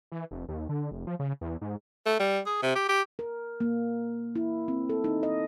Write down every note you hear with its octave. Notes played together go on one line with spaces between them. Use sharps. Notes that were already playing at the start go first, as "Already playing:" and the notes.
E3
F1
D#2
D3
F1
F3
C#3
E2
G#2
A3
G3
G#4
C3
G4
G4
A#4
A#3
E4
C4
A4
D#4
D#5